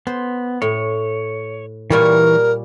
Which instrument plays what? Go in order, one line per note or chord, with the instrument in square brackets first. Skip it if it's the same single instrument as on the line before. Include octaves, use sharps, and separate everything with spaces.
[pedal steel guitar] B3 [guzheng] C5
[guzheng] A2 [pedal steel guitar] C#5
[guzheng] A#2 G3 C#5 [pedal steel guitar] E3 C#6 [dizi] A#4